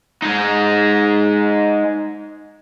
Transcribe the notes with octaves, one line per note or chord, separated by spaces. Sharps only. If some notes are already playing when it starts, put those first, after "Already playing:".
G#3 D#4